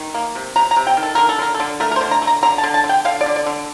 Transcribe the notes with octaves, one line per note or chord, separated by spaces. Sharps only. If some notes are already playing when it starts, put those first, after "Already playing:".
Already playing: D#3
A#3
C3
C3 A#5
A#5
C3
G5
D#3
A4
D3 A#4
A4
D3 A#4
A4
D3
A3 A#4
A#4
C5
D3
A#5
A3
A#5
D3 A#5
A5
D3
A5
D3
G5
D3 F5
D5
D3
D5
D3